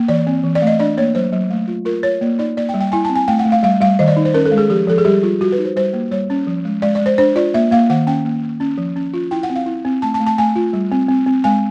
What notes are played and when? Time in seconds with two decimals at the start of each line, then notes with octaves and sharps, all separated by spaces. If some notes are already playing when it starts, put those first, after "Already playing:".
Already playing: A#3
0.08 E3 D5
0.27 C4
0.44 E3
0.55 D5
0.62 A3 D#5
0.79 D4 D5
0.97 A#3 C#5
1.15 F#3 C5
1.32 F#3
1.50 A3
1.68 F4
1.85 F4 A#4
2.03 F4 C#5
2.21 A#3 D5
2.39 D#4 D5
2.57 A#3 D5
2.69 G5
2.74 G3
2.81 G5
2.92 E4 G#5
3.05 C4 A5
3.16 G#5
3.28 A3 G5
3.39 F#5
3.45 A3
3.52 F5
3.63 G3 F5
3.81 G3 F5
3.99 D#3 D#5
4.08 D5
4.16 D#4
4.25 C5
4.34 C#4 A#4
4.46 A4
4.51 G#3
4.58 G#4
4.70 F3 G4
4.87 F3 A4
4.98 G#4
5.05 G3 G4
5.23 G3 F4
5.40 G3 F#4
5.52 B4
5.58 D#4
5.65 C5
5.76 G3 C5
5.93 A#3
6.11 G3 C#5
6.30 C#4
6.47 F3
6.65 G#3
6.82 G#3 D5
6.95 D5
7.01 G#3
7.06 C5
7.18 D4 C5
7.35 F4 D5
7.54 A#3 E5
7.71 A#3 F5
7.90 D#3 F#5
8.07 C#4 G5
8.25 A#3
8.43 A#3
8.60 C#4
8.78 F3
8.96 C#4
9.13 F4
9.31 E4 G5
9.43 F#5
9.50 C4
9.56 F5
9.66 E4
9.85 C4
10.02 A3 A5
10.14 A5
10.20 A3
10.26 A5
10.38 A3 G#5
10.56 F4
10.73 G3
10.92 C4
11.09 C4
11.26 C4
11.44 G#3 G#5